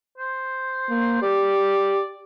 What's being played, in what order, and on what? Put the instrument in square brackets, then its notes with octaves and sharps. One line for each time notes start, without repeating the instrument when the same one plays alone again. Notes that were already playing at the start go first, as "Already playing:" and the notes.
[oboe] C5
[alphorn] A#3
[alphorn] G4 [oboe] D5